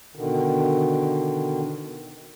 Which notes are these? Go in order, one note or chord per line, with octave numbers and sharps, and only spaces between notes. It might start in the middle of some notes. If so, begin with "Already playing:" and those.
B2 D3 D#3